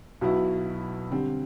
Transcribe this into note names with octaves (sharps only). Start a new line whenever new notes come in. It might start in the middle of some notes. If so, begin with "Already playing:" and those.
B1 B2 F#3 B3 E4
D3 G3 C4